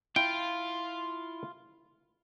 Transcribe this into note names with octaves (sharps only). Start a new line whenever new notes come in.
E4 F4 G5